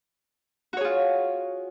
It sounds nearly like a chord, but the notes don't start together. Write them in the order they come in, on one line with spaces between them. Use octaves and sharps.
F#4 C#5 G#4 F4